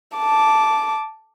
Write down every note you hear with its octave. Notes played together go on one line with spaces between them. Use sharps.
A5 D6